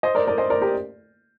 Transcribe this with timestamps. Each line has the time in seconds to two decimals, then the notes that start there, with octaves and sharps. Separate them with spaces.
0.03 C5 D#5
0.15 A#4 D5
0.27 A#4 D5
0.38 C5 D#5
0.50 A#4 D5
0.62 G4 A#4